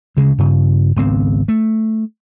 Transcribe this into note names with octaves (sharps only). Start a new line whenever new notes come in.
D2 C#3 G#3
G2 C#3
G#1 C#2 B3 C4
A3